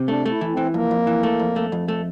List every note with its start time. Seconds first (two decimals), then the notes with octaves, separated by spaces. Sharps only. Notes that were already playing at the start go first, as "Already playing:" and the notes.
Already playing: C3
0.08 A3 D4
0.26 A3 E4
0.41 E3
0.52 E3 C4
0.74 F2 A#3
0.91 F2
1.07 E3
1.23 A3
1.39 F2
1.56 A3
1.72 F2
1.88 A3